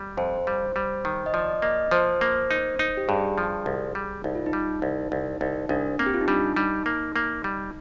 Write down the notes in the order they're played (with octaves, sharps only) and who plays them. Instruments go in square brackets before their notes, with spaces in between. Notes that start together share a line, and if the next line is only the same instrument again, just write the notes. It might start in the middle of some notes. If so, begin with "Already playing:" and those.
Already playing: [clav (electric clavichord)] G3
[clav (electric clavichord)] F2 [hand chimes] C5
[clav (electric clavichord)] G3
G3
D#3
[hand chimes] D#5
[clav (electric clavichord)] F3 [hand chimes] D5
[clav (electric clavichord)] A#3 [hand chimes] D#5
[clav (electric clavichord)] F3 [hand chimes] C5
[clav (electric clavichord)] A#3
D#4
D#4
[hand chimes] G4
[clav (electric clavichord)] G2 [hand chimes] G#4
[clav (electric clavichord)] F3
C2
G3
[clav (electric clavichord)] C2 [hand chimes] D#4
[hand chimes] F4
D#4
[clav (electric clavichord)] G3
C2
C2
[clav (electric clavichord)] C2 [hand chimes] D#4
[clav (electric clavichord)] C2 [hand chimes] D4
[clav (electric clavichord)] A#3 [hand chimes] C4
[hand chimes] G4
F4
D#4
[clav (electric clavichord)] G3 [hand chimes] D4
[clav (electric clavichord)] G3 [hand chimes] D#4
[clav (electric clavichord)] A#3
A#3
G3